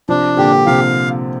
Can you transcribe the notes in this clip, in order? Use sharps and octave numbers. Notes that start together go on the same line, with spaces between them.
C3 F3 D4
A#2 D3 G4
C3 F3 F5